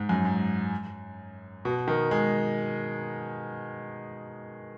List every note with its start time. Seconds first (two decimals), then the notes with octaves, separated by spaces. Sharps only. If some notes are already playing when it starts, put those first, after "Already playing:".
Already playing: G#2
0.09 F#2
0.25 G#2
1.65 B2
1.88 D#3
2.11 G#3